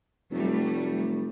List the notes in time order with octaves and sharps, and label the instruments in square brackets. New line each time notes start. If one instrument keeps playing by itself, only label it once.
[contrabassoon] F1 [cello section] F#3 G3 A3